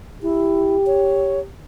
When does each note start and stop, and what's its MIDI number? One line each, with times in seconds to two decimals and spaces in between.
0.23 0.76 64
0.23 1.45 67
0.87 1.40 73